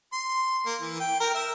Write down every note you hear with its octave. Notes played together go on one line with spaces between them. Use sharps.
C6
A#3
E3
G5
A#4
E5